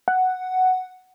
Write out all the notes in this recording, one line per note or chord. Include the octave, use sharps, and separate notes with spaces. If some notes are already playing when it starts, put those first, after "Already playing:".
F#5